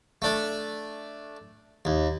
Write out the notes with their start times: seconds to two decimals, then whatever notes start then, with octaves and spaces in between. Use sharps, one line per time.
0.22 A3 D4
1.85 D#2